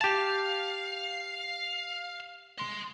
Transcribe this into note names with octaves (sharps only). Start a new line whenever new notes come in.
G4 F5 A5
D#5 C6